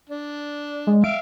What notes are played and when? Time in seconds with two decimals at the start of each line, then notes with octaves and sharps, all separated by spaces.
0.09 D4
0.87 G#3
1.04 E5 F5 D7